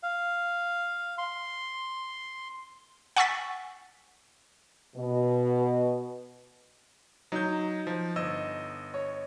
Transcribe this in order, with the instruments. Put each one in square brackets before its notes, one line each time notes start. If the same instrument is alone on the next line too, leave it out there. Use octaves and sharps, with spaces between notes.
[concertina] F5
C6
[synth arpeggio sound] F#5 G#5 C#6 E6 A6 B6
[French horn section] B2
[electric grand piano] F#3 G6 [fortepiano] D#4
[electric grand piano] F3
G1 D#5 E6
[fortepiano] C#5